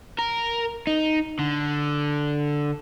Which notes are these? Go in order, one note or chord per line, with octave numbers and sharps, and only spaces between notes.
A#4
D#4
D3